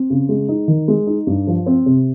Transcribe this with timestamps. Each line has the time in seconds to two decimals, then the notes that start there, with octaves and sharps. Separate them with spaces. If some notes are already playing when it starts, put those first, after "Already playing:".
Already playing: C4
0.10 C#3
0.29 G#3
0.49 D#4
0.68 D#3
0.88 G#3
1.07 D#4
1.27 G2
1.47 F3
1.66 C4
1.86 C3